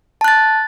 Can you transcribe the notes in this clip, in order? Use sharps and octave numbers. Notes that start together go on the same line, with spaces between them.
A5 F#6 A6